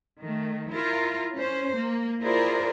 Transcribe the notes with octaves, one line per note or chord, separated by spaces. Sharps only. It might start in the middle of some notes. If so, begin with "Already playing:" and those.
D#3 A3
E4 F4 A#4
C#4 C5
A#3
E4 F4 G#4 A#4 C5 D5